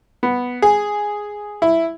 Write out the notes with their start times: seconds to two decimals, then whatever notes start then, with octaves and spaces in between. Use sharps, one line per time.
0.23 B3
0.62 G#4
1.62 E4